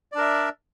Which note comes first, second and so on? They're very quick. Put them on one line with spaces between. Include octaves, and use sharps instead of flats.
D5 D4 A#4 E5